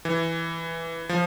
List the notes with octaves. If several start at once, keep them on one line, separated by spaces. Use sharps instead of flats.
E3
F3